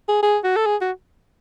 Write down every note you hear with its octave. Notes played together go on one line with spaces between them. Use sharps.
G#4
G#4
F#4
A4
G#4
F#4